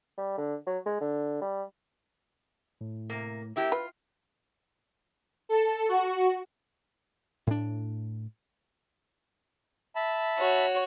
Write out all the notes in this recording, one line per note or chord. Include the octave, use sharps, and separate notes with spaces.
G3
D3
F#3
G#3
D3
G3
A2
C3 A#3
A#3 E4 G4
F4 B4
A4
F#4
A2 D4
E5 A5 B5
F#4 C#5